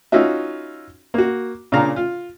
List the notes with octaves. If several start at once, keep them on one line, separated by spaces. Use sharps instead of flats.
C#4 D#4 F4 F#4 E5
A#3 F#4
A#2 C#3 D4 F5 A#5
F4